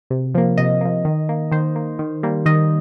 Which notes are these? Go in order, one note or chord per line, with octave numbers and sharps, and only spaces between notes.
C3
F3 A#3
C3 D#5
F3 A#3
D#3
A#3
D#3 C5
A#3
D#3
G3 A#3
D#3 D#5